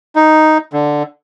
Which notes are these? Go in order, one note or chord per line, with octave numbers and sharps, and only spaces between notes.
D#4
D3